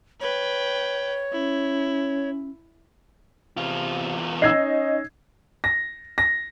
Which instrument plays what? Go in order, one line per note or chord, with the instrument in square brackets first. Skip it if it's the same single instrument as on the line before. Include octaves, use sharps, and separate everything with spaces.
[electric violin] B4 G5 [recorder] C#5
[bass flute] C#4 [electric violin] E4
[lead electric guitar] E2 F4 [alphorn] C3
[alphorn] C#4 [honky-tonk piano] D#4 [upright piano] E6 G#6 C7
[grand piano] A#6
A#6